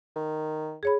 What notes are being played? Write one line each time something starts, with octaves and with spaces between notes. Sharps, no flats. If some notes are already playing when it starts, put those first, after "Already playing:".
D#3
G#4 C#5 B5